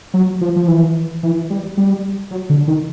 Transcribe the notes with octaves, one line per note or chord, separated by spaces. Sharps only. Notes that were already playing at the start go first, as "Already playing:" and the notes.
F#3
F3
F3
E3
E3
G3
G3
F#3
D3
D#3